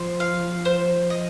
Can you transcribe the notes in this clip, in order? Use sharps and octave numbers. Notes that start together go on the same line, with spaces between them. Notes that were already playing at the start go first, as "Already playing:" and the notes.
Already playing: F3 C5
F5
C5
D#5